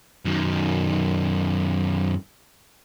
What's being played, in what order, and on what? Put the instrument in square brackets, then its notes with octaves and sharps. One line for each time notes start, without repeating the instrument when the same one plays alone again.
[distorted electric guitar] F#2 D#3